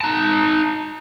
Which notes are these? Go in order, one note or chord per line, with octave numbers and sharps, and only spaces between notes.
D#4 A5